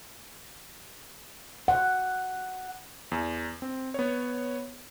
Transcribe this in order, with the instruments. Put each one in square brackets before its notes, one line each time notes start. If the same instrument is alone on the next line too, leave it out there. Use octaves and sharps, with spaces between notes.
[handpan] F#5
[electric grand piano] E2
C4
B3 C#5